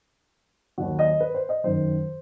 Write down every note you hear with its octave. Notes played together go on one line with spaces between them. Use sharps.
D#2 D#3 F#3 F#4
D#5
B4
C5
D#5
F#2 D#3 F#3 C5